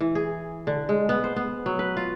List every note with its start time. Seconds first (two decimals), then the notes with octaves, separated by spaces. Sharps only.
0.01 E3
0.15 G#4
0.67 D3
0.89 G#3
1.09 B3
1.24 C5
1.36 B3
1.66 F#3
1.79 B4
1.97 F4